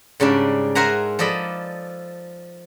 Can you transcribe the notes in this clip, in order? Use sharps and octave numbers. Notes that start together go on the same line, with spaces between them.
G#2 C#3 G3 D4
A#4 C5 E5 F#5 G#5 A#5
F3 A4 D5 D#5 B5